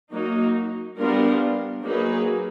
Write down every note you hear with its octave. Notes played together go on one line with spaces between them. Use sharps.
F#3 A#3 D#4 F#4
G3 B3 D4 F4 A#4
F#3 A#3 D#4 G#4 B4